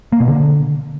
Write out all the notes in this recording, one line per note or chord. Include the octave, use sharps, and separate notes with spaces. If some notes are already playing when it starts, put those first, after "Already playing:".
A#3
B2
D3